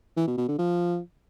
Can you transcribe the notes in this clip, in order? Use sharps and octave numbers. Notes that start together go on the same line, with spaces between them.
E3
B2
B2
D3
F3